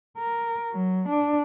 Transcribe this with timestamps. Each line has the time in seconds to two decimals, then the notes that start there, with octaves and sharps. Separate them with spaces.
0.18 A#4
0.73 F#3
1.09 D4